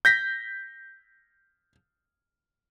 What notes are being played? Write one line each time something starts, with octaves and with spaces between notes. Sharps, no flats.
G6 A#6 B6